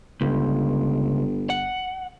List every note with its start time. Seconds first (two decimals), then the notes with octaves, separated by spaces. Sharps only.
0.21 G1 C#2
1.50 F#5